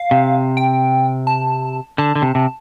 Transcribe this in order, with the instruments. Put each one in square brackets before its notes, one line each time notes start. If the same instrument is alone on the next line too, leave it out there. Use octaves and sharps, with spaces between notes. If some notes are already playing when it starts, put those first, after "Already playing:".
Already playing: [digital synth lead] F5
[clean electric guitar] C3
[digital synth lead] G5
A5
[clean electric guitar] D3 [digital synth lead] A5
[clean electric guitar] D3
C3
C3